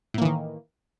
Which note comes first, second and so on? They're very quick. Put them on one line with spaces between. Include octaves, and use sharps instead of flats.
A2 A#3 E3 D#3